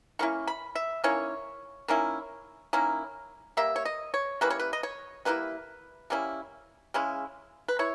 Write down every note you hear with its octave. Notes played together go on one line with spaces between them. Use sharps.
D#3 A#3 C#4 E4 C#6
B5
E5
D#3 A#3 C#4 E4 C#5
D#3 A#3 C#4 E4
D#3 A#3 C#4 E4
G3 A#3 E5
C#5
D#5
C#5
G3 A#3 C#4 E4 B4
C#5
B4
D#5
C#5
G3 A#3 C#4 E4 B4
G3 A#3 C#4 E4
C#3 G#3 C#4 E4
B4
E4 C#5